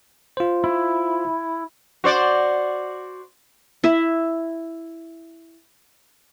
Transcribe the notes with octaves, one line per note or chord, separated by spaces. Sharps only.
F4 C5
E4
F#4 C5 D5
E4 E5